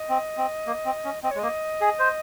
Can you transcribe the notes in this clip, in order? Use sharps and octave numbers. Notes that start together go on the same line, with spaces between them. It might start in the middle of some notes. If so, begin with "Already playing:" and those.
Already playing: D#5
C4
C4
A#3
C4
C#4
C4 D#5
C#5
G#3
A#3 D#5
G#4
C5